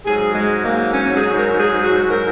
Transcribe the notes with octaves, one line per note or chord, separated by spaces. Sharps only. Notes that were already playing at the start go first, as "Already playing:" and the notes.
G#2 F#3 G#4
G#3
A#3
C#4
G#4
A#4
G#4
F#4
A#4